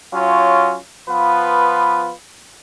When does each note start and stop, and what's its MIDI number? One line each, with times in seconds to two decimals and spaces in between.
0.12 0.75 54
0.12 0.75 61
0.12 0.75 65
1.09 2.11 53
1.09 2.11 59
1.09 2.11 65
1.09 2.11 71